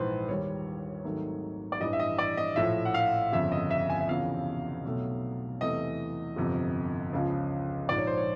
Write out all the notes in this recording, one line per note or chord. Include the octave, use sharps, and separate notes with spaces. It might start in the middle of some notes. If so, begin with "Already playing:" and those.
Already playing: A#1 G#2 E3 G#3 B4 C5
D#2 D#3 G3 C#5
G#1 G#2 D#3 F#3 A3
D5
A1 G2 E3 D#5
E5
D#5
D5
D#5
A#1 A2 F3 E5
F#5
F5
G1 F2 C#3 E5
D#5
E5
G#5
E5
F1 E2 C#3 F3 F5
B1 B2 F#3 A3
E2 C3 E3 A3 D#5
G1 F2 C3
C#2 C#3 F3
A#1 G#2 F3 D5
C#5
C5
C#5